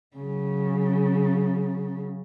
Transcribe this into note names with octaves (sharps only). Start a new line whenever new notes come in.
C#3 F#3